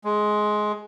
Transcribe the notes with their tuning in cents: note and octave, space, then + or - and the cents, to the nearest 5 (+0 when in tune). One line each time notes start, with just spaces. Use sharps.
G#3 +15